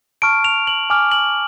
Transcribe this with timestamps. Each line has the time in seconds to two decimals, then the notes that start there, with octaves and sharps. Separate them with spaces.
0.22 A5 C#6 F6 D7
0.44 F7
0.67 F#7
0.90 G#5 D6 F6
1.12 F#7